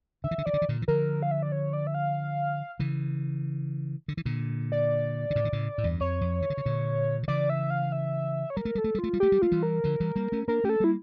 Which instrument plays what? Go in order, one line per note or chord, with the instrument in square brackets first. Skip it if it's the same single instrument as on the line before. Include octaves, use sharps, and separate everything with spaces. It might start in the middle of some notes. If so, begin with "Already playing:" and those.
[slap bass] D3 [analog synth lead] E5
[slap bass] E3
D3
[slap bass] E3 [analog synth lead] D5
[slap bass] D3
E3
A#2 D3
E3
[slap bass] D3 F3 [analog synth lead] A#4
[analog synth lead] F5
E5
D5
C#5
D5
E5
F5
[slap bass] C#3 E3
D3
E3
A#2 D3
[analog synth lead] D5
[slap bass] D3
A2 C#3
D3
A2 C#3
A2
E2 G2
[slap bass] F2 [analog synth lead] C#5
[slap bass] F2
E3
D3
C#3
A#2 D3
D3
[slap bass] C#3 E3 [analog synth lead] D5
[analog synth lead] E5
F5
E5
C#5
[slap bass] G3 [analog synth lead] A#4
[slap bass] A3
[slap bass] G3 [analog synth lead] A4
[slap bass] A3
G3
[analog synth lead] F4
[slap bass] A3
G3
[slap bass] A3 [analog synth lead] G4
[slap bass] G3
[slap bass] A3 [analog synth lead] F4
[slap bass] E3 G3
[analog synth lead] A#4
[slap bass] D3 F3
E3 G3
G3 A#3
A3 C#4
[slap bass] A#3 D4 [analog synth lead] A#4
[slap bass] A3 C#4 [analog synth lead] G4
[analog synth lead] A4
[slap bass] G3 A#3 [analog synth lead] E4